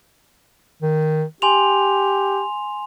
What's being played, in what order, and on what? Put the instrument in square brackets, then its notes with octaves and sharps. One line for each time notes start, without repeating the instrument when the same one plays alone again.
[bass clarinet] D#3
[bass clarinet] G4 [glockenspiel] G#5 C6 F7